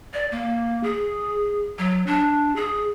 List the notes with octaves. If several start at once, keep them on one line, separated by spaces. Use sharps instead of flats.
D5
A#3
G#4
F#3
D4
G#4